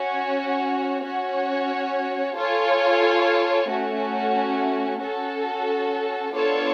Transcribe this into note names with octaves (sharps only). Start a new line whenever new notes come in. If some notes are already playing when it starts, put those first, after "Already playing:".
Already playing: C#4 F#4 C#5
C#4 F#4 C#5
F4 A4 C#5 G#5
A3 C#4 F#4
C#4 F#4 A4
B3 D4 F4 A4 C#5